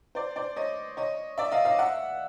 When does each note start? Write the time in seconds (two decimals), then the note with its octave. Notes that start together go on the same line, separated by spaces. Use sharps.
0.15 C5 D5
0.36 C5 D5
0.56 C#5 D#5
0.97 C#5 D#5
1.38 D5 E5
1.52 D#5 F5
1.65 D#5 F5
1.79 E5 F#5